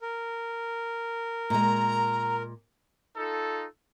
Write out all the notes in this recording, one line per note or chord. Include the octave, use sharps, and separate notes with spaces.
A#4
A#2 G#3 A#5
D#4 F4 A4